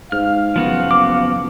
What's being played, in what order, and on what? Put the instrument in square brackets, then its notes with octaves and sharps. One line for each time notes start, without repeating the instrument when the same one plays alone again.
[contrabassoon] G#2 [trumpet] F5 [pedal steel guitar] F6
[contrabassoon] F#1 [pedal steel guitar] F3 B3 F#4
[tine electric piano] D6